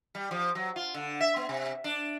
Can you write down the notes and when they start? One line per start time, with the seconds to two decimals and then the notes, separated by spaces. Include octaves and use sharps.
0.15 G3
0.31 F3
0.55 F#3
0.76 F4
0.94 D3
1.20 E5
1.36 B3
1.49 C3
1.84 D4